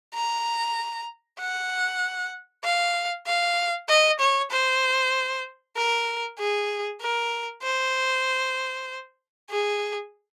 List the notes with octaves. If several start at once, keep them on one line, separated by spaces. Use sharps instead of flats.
A#5
F#5
F5
F5
D#5
C#5
C5
A#4
G#4
A#4
C5
G#4